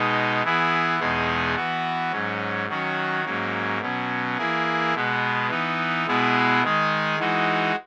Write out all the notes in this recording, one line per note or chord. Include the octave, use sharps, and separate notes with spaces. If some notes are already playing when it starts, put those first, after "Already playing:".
Already playing: B2 G#3 D#4
E3 B3 E4 G#4
E2 B2 G#3 D#4 G#4
E3 B3 F#4
G#2 F#3 C#4
D#3 F#3 C#4 F#4
G#2 F#3 A#3 C#4
B2 F#3 C#4
E3 A#3 E4 G#4
B2 G#3 B3
E3 B3 D#4
B2 G#3 B3 E4 G#4
D#3 G#3 D#4 G#4
E3 G#3 D#4 F#4